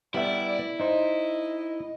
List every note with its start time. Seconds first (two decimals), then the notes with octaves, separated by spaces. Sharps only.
0.14 G3 B3 E4 D5 E5
0.80 D#4 C5 D#5